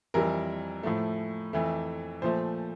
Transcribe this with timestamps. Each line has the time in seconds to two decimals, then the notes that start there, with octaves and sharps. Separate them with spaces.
0.14 F2 E3 G3 A#4
0.83 A2 F3 A3
1.53 F2 E3 A3
2.22 A#2 F3 A3 C5